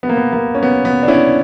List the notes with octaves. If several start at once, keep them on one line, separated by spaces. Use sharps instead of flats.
B3
A#3
B3
A#3
C#4
B3
B3
D4
C#4 E4